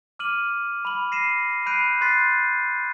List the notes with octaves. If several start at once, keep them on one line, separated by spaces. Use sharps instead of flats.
D6 F6 D#7 F#7
B5 F#7
A#6 C7 D#7 E7
B5 F#6 G6 C7 D7 D#7
C6 F#6 G6 A6 B6 C7